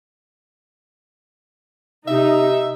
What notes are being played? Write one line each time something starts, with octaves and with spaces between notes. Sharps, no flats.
C3 D#4 E5